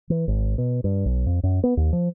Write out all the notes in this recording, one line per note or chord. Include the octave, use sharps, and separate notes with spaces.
E3
G#1
B2
G2
B1
F2
F#2
B3
D#2
F3